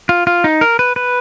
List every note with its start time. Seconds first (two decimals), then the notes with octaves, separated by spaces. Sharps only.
0.09 F4
0.27 F4
0.44 D#4
0.61 A#4
0.79 B4
0.96 B4